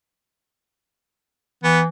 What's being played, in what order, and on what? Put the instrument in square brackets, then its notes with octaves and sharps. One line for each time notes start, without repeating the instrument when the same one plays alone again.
[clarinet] E3 [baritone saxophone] B3